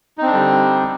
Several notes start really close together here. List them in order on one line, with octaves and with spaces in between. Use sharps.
D#4 C4 D4 D3 G3